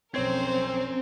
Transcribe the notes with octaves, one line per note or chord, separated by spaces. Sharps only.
B1 F2 C4 C#4 A#4 C5 C#5 G#6